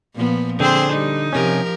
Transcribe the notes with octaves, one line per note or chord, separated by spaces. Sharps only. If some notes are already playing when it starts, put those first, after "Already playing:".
A#2 F3 B3
D3 C4 G#4 C5
G3 D#4
C3 F3 C#4 G4 A#4